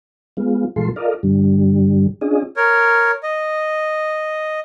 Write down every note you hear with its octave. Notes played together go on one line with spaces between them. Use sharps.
G#3 B3 F4
A#2 E3 G#3 F4 A4 C6
F4 A4 A#4 D5 D#5 F5
G2 D3 G3
C#4 D4 F4 G#4 D#5
A#4 C#5
D#5